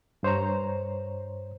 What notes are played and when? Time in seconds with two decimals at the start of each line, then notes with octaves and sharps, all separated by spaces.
0.23 G2 C5 C#5 A#5